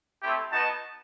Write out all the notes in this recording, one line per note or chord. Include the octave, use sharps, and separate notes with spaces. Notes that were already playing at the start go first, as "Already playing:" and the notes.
A3 C4 E4 G4
B3 D#4 F#4 A5